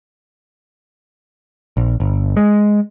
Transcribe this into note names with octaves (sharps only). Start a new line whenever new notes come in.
A#1
G1
G#3